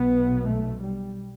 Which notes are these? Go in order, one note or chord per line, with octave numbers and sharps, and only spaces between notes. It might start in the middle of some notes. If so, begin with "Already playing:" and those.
Already playing: B1 B2 B3
A3
G3